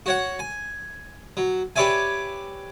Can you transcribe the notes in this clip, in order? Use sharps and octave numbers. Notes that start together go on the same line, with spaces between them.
F#4 C#5 F#5
G#5
F#3
G4 B4 C#5 D5 E5 G#5